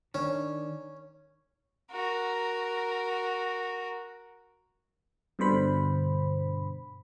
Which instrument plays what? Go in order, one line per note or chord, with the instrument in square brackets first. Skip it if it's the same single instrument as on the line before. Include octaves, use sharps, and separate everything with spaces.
[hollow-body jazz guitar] D#3 D4 [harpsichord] C#4
[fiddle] F#4 A#4
[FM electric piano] G2 B2 D3 C5 B5